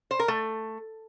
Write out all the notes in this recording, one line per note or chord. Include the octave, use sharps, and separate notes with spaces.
C5
A#4
A3